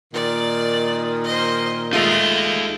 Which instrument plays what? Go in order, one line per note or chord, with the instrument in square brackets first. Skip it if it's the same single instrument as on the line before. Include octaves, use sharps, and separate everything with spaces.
[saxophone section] A#2 D#3 [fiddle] D5
[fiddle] C5 D#5
[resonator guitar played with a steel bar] G#3 A3 F4 [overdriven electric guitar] D#4 F5 [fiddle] D#5